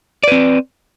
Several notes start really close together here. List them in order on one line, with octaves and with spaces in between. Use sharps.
D5 B4 C4